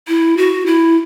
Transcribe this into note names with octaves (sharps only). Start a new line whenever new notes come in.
E4
F#4
E4